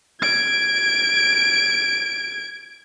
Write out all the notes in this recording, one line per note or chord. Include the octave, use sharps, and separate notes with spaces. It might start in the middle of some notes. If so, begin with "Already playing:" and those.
G#6 D7